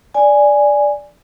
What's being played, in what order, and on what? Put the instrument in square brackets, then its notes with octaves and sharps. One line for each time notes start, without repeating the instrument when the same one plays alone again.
[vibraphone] D5 G#5